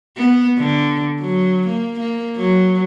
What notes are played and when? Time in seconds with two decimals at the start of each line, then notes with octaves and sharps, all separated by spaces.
0.17 B3
0.58 D3
1.20 F#3
1.67 A#3
2.00 A#3
2.37 F#3